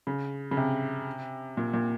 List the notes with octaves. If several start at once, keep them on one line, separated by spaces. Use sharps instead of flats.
C#3
C#3
C3
A#2
A#2